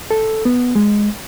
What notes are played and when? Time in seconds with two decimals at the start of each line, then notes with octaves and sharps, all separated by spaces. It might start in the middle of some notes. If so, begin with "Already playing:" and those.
0.11 A4
0.45 B3
0.75 G#3